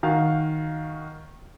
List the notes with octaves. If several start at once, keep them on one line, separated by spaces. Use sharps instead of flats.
D#3 F#4 F5